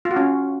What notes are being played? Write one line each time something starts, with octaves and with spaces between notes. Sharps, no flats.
F4
F#4
C#4